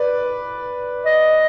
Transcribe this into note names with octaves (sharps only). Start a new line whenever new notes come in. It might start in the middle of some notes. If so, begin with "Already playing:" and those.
Already playing: B4 D5
D#5